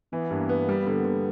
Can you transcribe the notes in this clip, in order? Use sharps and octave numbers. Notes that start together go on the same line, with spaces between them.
E3 B3
G2 A#3
A#3 B3
G3
D3
D3